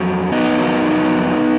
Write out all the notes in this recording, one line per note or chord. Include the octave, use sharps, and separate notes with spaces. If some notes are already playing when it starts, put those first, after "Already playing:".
Already playing: F2 F#3
B3 D#4
F2 D#3 F#3